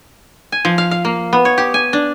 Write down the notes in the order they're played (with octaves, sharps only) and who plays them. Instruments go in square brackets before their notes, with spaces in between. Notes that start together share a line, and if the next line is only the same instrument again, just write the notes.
[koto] G#5
F3
F5
F5
A#3
B3
C#5
G4
G#5
D4